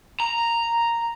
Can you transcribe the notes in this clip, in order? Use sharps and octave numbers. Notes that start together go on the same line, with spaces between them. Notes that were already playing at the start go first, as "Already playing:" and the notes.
A#5